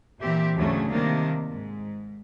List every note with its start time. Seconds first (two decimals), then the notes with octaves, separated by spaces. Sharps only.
0.20 A#2 E3 C4 G4 E5
0.56 D2 G#2 C#3 F#3 A3 C#4
0.89 C3 D#3 G3 A#3 D4
1.48 G#2